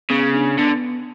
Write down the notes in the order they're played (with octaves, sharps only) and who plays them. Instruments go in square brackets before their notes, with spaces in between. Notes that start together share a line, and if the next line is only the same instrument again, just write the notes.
[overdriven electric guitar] C#3 [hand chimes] B3
[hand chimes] D4
[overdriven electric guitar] D3 [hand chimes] B3